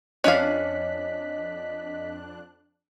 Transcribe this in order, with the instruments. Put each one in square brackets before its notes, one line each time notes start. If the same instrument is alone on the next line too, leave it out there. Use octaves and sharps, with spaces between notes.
[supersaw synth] F2 D4 F#6 [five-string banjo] C#4 F5 [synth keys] D#5 B6